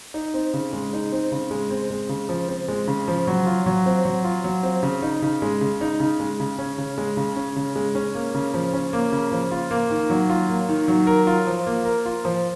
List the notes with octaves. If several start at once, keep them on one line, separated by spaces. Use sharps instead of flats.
D#4
C4
C#3
G#3
D#4
C4
C#3
G#3
C4
G#3
C#3
F3
C4
G#3
C#3
F3
F#3
F4
F#3
C4
F#3
F4
F#3
C4
C#3
D#4
C#3
G#3
C#3
D#4
C#3
G#3
C#3
C#4
C#3
G#3
C#3
C#4
C#3
G#3
C#4
A#3
C#3
F3
C#4
A#3
C#3
F3
F4
A#3
D#3
F#3
F4
A#3
D#3
F#3
A#4
F4
F3
A#3
A#4
F4
F3